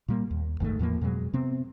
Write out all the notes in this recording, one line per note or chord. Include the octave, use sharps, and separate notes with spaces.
A#2 G3 A#3
D#2
F#1 G#2 D#3 A3
E2 A2 F3 A#3
F2 B2 F#3 G#3
C3 B3 C4